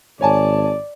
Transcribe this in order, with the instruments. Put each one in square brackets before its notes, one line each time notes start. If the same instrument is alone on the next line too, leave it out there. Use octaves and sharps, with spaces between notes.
[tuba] G#1 [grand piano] C#5 G#5 A5 [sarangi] D5